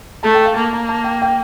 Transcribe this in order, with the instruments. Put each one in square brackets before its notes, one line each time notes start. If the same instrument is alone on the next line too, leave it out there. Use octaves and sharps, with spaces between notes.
[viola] A3 [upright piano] A5
[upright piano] G5
F5
[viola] A#3 [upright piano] A5
[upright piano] A#5
A5
G5
G5